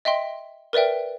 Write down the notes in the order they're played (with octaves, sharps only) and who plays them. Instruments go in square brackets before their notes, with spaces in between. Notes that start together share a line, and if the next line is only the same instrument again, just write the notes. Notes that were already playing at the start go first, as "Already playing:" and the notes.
[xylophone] D#5 E5 G5 C6
A#4 B4 D5 E5 G5